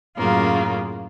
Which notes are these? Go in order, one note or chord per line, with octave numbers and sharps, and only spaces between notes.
F#2 A2 C#3 A#3 F4